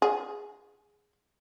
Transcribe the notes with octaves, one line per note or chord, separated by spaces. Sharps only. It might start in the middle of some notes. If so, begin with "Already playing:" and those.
G#4